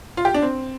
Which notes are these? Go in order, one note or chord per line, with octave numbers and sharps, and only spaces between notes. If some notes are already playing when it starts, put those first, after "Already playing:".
F4
G4
D4
C4